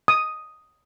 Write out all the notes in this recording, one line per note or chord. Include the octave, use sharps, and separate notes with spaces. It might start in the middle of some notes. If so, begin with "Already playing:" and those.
D#6